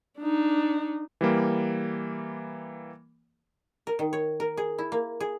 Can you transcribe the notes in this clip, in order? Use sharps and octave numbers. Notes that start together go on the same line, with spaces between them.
D4 D#4
E3 G3 A#3
A#4
D#3
C#5
A#4
G#4
E4
A#3
G#4